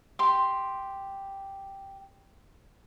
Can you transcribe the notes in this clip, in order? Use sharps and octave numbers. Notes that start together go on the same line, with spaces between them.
G4 C6